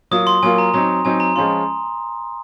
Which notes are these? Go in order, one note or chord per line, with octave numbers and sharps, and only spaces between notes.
F#3 A#3 F4 D#6
C6
F#3 A#3 F4 G#5
A#5
F#3 C4 D#4 A#5
F#3 C4 D#4 G#5
A#5
F3 G#3 C#4 F4 C6